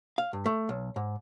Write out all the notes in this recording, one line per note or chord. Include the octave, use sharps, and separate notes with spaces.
F5
G2
A3
B1
G#2